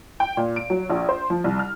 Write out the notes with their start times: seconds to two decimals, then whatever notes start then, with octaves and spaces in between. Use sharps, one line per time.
0.20 G5
0.37 A#2
0.56 D7
0.70 F#3
0.90 A#1
1.09 C5
1.30 F3
1.44 C2
1.59 F6